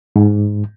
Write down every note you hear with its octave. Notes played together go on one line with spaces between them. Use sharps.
G#2